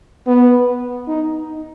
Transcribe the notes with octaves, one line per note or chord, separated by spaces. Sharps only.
B3
D#4